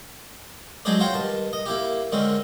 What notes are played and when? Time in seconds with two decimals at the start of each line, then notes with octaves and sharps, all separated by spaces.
0.85 F#3 G#3 D4 G#4 C5 D5
1.00 F4 F#4 C5 C#5 G5
1.14 G2 D#3 A5
1.53 D#5
1.66 A#3 E4 G4
2.12 D3 D#3 G#3 C4 C#4